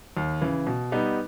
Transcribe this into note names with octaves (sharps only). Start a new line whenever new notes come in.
D#2
C#3 E3
B2
G3 B3 D#4